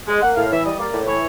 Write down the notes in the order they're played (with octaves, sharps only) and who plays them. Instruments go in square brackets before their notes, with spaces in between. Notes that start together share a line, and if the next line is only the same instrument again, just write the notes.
[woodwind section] G#3
A#3 F#5
A2 F5
E3 E5
G3 D#5
A#3 D5
A2
E3 C#5